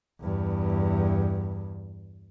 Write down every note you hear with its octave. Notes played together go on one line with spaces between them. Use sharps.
E2 G2